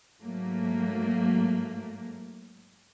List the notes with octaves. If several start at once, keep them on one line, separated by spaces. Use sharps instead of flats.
G#2 F#3 A3 A#3